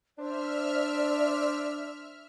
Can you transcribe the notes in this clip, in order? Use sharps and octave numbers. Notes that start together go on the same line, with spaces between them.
D4 C5 D5 E5 F6